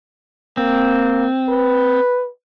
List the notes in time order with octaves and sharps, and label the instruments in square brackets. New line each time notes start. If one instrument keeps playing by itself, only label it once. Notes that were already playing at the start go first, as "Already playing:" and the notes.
[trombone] A#3 [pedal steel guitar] C4
[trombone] B4